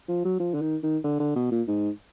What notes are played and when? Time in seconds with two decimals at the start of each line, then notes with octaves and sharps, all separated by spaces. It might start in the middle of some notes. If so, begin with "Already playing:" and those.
0.08 F3
0.25 F#3
0.40 F3
0.54 D3
0.61 D#3
0.83 D#3
1.04 D3
1.20 D3
1.35 B2
1.51 A#2
1.68 G#2